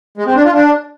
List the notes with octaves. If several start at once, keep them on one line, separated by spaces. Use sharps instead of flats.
G#3
C4
D4
F4
D4